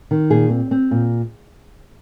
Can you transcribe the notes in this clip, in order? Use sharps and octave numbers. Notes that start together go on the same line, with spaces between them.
D#3
A#2 G#4
C4
C4
A#2